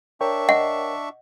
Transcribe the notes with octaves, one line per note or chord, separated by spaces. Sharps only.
D4 A#4 C#5 E5 G5 C#6
D#5 F#5